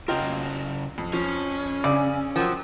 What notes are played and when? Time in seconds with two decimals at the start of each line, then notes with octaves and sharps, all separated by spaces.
0.08 C#3 F4 F#4 A#4 D#5 G5
0.98 F2
1.13 F3 C#4
1.84 C#3 G#4 D5 D#6 E6
2.36 F3 F#3 A#4 F#5 G5